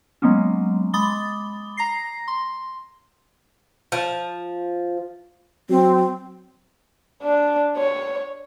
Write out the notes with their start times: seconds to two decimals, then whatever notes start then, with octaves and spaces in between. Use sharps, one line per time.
0.22 F#3 G#3 A#3 B3 C#4
0.94 G#3 B5 D6 D#6 A6 G7
1.77 A#5 A#6 C7
2.28 C6
3.92 F3
5.70 F#3 C4
7.23 D4
7.77 C#5